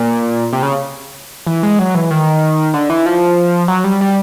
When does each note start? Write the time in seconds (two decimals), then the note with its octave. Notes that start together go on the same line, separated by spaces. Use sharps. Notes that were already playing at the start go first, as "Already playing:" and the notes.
Already playing: A#2
0.53 C3
0.63 C#3
1.47 E3
1.63 G#3
1.79 F#3
1.95 E3
2.11 D#3
2.74 D3
2.90 E3
3.06 F3
3.68 F#3
3.84 G3
4.01 G3